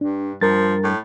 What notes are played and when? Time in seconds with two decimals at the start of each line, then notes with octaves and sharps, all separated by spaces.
0.01 G2 D4
0.41 G2 F3 A#4 A6
0.83 A2